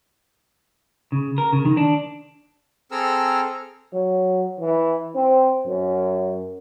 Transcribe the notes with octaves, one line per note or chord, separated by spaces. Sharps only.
C#3
A#4
C#3
D#3
D4
C4 G#4 A4 A#5 E6 F6
F#3
E3
C4
F#2